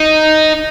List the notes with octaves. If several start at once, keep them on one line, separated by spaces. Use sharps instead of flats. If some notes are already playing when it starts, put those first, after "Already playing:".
Already playing: D#4